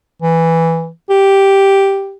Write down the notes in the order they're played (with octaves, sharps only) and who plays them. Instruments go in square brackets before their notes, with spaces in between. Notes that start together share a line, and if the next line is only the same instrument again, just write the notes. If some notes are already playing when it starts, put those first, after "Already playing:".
[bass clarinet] E3
G4